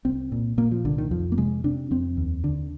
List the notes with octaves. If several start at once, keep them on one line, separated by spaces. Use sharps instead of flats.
C2 C4
A#2
A#2 A#3
F3
C2 D3
D#3
F2 F3
A#3
C3 G#3
C3 D4
F2 C4
D#2
D3